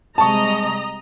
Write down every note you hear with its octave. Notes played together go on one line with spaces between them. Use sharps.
C3 G3 G#3 D#5 A5 A#5 C#6